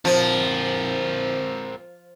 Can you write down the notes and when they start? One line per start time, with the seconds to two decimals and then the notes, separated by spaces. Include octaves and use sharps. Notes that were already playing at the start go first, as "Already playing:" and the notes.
0.05 F3 C4 A#4